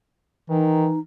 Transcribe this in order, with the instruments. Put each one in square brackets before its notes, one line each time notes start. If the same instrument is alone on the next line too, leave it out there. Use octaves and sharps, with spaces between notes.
[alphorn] D#3 [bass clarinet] E3 [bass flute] D#4